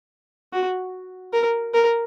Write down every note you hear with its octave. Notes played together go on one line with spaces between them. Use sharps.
F#4
A#4
A#4